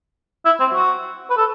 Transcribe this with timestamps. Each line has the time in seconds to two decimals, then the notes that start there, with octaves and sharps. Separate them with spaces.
0.45 E4
0.60 C4
0.74 F#4
1.30 B4
1.37 A4